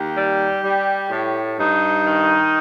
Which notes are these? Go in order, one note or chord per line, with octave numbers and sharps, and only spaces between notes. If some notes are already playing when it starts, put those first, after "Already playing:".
Already playing: D#2 G4
G3
G3
A2
G2 D#4
D#3